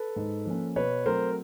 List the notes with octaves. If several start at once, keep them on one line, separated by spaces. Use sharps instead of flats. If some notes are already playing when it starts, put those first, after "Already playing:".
Already playing: A4 B4
G#2
F3 A#3 C#4
B2 B4 C#5
F#3 A3 C4 A#4 C5